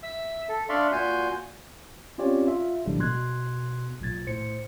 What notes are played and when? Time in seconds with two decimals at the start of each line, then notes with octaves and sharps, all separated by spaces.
0.03 E5 E6
0.49 A4
0.69 D4 D5 E5 F5 C6 C#6
0.92 A#2 F#4 G#5 C6 G6
2.18 C4 C#4 F4 G4 C#5 D5
2.47 F4 E5
2.85 B1 A2 D3 F3 G3 G#3
3.00 B2 C6 F#6 G#6
4.01 B1 A#2 G#6 A6
4.26 A2 C5 C#7